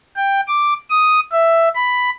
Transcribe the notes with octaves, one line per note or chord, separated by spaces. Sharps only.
G5
D6
D#6
E5
B5